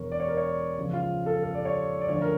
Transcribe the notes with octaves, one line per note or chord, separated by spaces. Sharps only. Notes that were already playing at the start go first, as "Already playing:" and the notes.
Already playing: E1 E2 E3 A#4 C#5
D5
C#5
A#4
C#5
C#2 C#3 F3
F4
A4
A4
D5
C#5
D5
D2 D3 F3 C#5
A#4